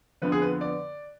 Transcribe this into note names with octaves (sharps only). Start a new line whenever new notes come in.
F2 D3 F3 B3 B4
G#4
B4
D5